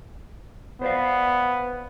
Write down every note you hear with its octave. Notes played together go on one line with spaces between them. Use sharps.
B3 C5 D5 F5